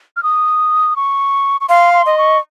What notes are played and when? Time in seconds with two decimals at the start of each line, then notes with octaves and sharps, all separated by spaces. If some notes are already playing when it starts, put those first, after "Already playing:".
0.16 F6
0.23 D#6
0.96 C#6
1.61 C#6
1.69 F5 C6
1.94 C6
2.06 D#5
2.18 C#6